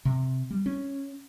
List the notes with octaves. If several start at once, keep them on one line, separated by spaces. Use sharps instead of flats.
C3
G3
C#4